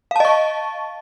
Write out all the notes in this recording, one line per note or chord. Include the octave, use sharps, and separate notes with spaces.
D#5 F5 A5 C#6